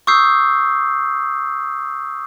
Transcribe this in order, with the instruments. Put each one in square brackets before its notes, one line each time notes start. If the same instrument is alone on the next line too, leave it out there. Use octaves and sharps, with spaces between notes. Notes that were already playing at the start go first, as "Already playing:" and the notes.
[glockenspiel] C#6 D#6 E6 G6 C7